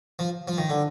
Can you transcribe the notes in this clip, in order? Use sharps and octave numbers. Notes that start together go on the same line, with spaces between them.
F3
F3
D#3
D3